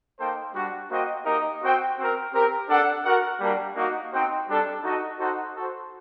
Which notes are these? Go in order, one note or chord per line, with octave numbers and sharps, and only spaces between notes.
A#3 D#4 A4 C5 G5
G3 D4 F#4
A#3 F#4 C5 D#5 G5
A#3 D#4 G4 A#4 D#5
C4 F#4 C5 G5
C4 F#4 A#4
C4 G4 A#4
D4 A4 D5 F#5
F#4 A#4 F#5
G3 A#3 D4
A#3 D#4 F#4
C4 D#4 F#4 C5 G5
G3 D4 A4
D#4 F#4 A4 D#5
D#4 F#4 A4 C5 F#5
F#4 A4 C5